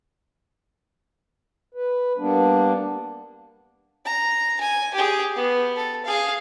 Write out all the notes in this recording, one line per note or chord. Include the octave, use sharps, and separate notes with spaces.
B4
G3 A#3 B3 D4
A#5
G#5
G4 G#4
B3
A4
G#4 F5